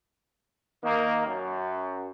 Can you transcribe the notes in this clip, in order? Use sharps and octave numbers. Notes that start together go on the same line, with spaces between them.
D#3 A#3
F#2